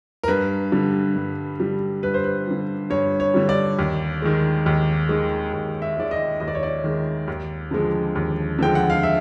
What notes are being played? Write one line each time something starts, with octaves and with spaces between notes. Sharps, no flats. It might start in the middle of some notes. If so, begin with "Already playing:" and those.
A#4
G2 B4
D3 G3
G2
D3 G3
G2 B4
C5
B4
D3 G3
G2 C#5
C#5
D3 G3
D5
D#2
D#3 G#3
D#2
D#3 G#3
D#2
E5
D#3 G#3 D5
D#5
D#2 D#5
D5
C#5
D5
D#3 G#3
D#2
D3 F3 G#3
D#2
D3 F3 G#3 G5
F#5
F5
E5